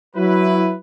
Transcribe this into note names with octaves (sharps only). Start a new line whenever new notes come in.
F#3 E4 B4